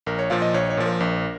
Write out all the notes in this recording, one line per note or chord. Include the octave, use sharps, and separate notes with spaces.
A#1 A#4
C#5
A#2 F3 F5
D#5
A#1 C#5
C#5
A#2 F3
A#4
A#1